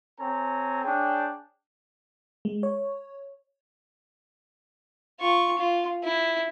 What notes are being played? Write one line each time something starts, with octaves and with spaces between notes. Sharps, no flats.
C4 A4 C#5 G#5 A#5
D4 G#4 C#5 G5
G#3
C#5
F4 C#6
F4
E4